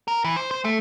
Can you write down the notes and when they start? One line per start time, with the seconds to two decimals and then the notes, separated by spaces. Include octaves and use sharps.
0.08 A#4
0.24 E3
0.36 C5
0.51 C5
0.65 A3